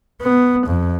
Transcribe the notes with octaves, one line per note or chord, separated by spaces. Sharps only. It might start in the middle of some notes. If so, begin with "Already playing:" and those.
B3
F2